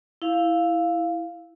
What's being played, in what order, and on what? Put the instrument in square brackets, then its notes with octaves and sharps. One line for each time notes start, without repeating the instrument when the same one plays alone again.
[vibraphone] E4 F5